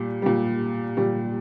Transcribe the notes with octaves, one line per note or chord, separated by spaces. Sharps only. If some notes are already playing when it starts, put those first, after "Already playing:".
Already playing: A#2 G3
A#2 G3
A#2 G3